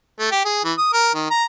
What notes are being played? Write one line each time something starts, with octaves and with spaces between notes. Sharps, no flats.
A3
G4
G#4
E3
D#6
A#4
D#3
A#5